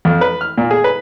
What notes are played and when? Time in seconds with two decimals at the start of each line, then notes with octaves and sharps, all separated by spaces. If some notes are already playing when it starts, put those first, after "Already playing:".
0.05 F2
0.21 B4
0.41 F6
0.58 A#2
0.71 G#4
0.84 B4